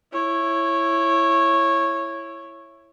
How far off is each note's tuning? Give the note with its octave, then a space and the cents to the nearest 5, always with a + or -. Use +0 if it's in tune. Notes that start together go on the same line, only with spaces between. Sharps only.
E4 +15 C#5 -15